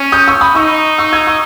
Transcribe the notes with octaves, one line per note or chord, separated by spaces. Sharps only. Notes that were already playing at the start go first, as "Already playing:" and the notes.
Already playing: C#4
D#6 G6
C#6 E6
B5 D#6
D#4 C#6 E6
C#6 E6
E6 G#6
C#6 E6